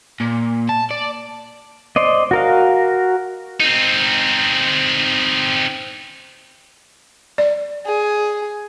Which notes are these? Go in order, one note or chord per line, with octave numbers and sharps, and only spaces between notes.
A#2
A5
D5
C5 D5 D#5
F#4 A#4 F5
C4 D#4
D5
G#4